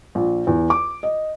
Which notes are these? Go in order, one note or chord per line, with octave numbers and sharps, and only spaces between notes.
A#1
E2
D6
D#5